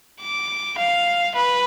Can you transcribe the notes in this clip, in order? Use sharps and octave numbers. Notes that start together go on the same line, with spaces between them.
D6
F5
B4